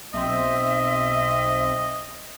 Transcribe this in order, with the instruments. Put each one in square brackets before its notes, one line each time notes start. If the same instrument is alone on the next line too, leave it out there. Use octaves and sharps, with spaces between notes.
[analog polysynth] B1 C4 [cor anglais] D#5 [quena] E5